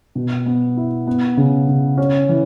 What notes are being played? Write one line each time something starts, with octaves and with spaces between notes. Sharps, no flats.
B2
B3
E4
B3
C#3
C#3
C#4
E3